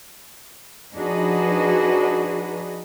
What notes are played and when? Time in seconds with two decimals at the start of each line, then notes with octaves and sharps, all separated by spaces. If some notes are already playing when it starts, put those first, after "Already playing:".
0.97 F3 D4 D#4 F#4 G#4 B4